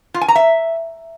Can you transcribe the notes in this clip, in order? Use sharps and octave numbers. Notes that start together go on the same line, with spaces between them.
F4
G#5
A#5
E5